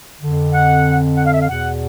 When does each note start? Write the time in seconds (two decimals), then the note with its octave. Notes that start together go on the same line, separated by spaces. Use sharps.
0.21 F2 D3
0.53 F#5
1.17 F#5
1.25 F5
1.33 E5
1.41 F5
1.48 E2 B2 F#5